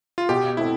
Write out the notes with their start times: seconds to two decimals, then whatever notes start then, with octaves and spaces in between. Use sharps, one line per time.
0.18 F4
0.29 B2 G4
0.57 A3 C4 E4